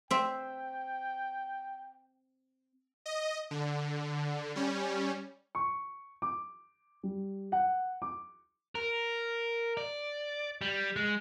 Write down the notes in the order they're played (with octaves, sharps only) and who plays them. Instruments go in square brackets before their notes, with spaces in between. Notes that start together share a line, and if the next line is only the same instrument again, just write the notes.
[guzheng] C4 E5 [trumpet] G5
[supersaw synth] D#5
D3
G3 C#4
[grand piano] C#6
D6
G3
F#5
D6
[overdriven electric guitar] A#4
D5
G3
G#3